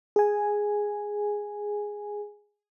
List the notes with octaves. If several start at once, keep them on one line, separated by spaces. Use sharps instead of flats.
G#4 G#5